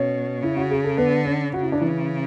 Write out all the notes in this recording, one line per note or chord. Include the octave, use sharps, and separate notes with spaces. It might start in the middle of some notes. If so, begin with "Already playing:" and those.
Already playing: B2 C#4 C#5
C#3 E4
F#4
G#4
A4
D3 B3 B4
C#4 C#5
C#3 F#4
E4
D4
E3 E4